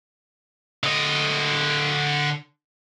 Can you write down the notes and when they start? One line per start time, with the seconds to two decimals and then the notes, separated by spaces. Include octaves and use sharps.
0.83 D3 D#5